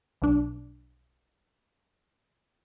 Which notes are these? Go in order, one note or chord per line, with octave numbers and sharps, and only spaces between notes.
B1 D4